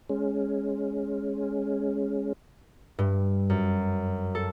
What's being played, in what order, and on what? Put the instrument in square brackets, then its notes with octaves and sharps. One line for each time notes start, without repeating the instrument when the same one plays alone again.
[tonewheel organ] G#3 C#4
[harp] G2
F#2
A4